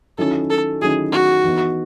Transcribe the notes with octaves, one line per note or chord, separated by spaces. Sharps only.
D#3 F#3 C#4 E4 A4
A4
D#3 F#3 C#4 E4 G#4
F#4
E3 B3 D#4